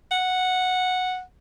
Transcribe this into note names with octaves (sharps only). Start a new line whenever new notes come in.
F#5